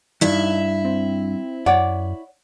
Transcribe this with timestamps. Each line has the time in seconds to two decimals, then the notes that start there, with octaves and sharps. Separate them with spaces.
0.21 G2 D#4 E4 E5
0.85 C4
1.66 F#2 C#5 D5 F#5